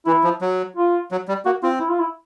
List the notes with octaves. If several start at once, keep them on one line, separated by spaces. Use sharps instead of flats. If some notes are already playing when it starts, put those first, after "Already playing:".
E3 E4
F3
F#3
F4
F#3
G3
A#3 F#4
C4 F4
E4
F4
E4